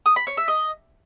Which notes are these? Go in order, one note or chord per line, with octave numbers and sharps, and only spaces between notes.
D#6
B5
C#5
E5
D#5